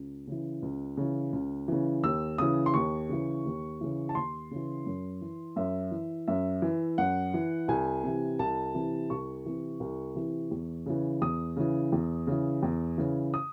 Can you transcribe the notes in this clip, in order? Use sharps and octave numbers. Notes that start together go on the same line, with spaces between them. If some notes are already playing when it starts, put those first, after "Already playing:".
Already playing: C#2
C#3 E3
C#2
C#3 E3
C#2
C#3 E3
D#2 E6
C#3 E3 D#6
C6
D#2 C#6
C#3 E3
D#2
C#3 E3
A5
D#2 C6
C#3 E3
F#2
E3
F#2 E5
E3
F#2 E5
E3
F#2 F#5
E3
C2 G#5
C3 E3
C2 A5
C3 E3
C2 C#6
C3 E3
C2
C3 E3
E2
C#3 E3
E2 D#6
C#3 E3
E2
C#3 E3
E2
C#3 E3
D#6